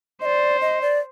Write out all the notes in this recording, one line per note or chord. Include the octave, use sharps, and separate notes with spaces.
C5 D5 D#5
D#5
D5